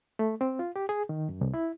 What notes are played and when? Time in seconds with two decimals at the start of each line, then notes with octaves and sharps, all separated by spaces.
0.19 A3
0.41 C4
0.59 F4
0.76 G4
0.89 G#4
1.09 D#3
1.29 F#2
1.41 C2
1.54 E4